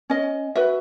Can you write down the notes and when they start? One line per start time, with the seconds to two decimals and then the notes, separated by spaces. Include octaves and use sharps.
0.10 C#4 D#5
0.55 F#4 B4 E5